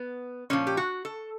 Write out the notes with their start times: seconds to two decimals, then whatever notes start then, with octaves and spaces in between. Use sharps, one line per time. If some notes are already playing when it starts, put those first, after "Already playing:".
Already playing: B3
0.50 A#2 F3 C#4
0.67 G4
0.77 F#4
1.05 A4